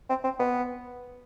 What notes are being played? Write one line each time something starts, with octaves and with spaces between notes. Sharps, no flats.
C4
C4
B3